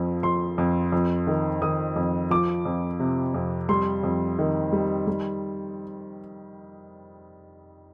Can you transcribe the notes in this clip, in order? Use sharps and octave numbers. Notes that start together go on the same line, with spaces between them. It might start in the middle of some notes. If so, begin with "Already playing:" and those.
Already playing: F2 F3
F2 C6
F2
F2
D#3
D#3 D#6
F2
F3 D6
F2
C3
F2
G3 C6
F2
D#3
G3
G3